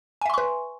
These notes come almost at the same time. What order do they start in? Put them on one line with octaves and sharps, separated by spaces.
G#5 E5 C6 C#6 B4